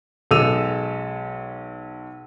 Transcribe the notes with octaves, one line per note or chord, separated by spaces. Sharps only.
B1 G#3 A4 E6 D#7 F7